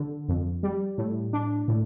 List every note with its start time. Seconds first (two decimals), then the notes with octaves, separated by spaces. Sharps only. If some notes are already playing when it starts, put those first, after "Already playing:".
Already playing: D3
0.28 F2
0.63 G3
0.98 A2
1.33 D4
1.68 A2